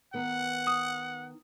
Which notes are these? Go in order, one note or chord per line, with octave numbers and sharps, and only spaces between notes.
D#3 B3 F#5
D#6